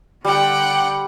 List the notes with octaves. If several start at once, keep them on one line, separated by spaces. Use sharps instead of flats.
D3 G3 F#5 G5